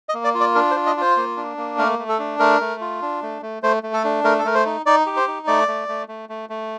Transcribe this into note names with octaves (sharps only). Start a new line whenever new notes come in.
D#5
A#3
D5
F4
D5
D4 A#4
C5
F4
D#5
F4 C5
A#3
D4
A#3
A3 A#4
A3
A4
D4
A3 A#4
A3
F4
D4
A3
A3
A3 C5
A3
A4
D4
A3 A#4
A4
A3 A#4
C5
D#4
D#4 D5
G4
C5
D#4
A3 D5
A3
A3
A3
A3
A3